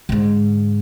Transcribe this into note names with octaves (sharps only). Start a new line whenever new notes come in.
G#2 D3